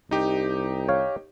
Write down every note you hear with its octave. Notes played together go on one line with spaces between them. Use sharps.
C2 D#4 G4
C#5 F5